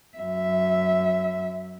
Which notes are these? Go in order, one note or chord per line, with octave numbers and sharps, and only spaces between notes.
F#2 E5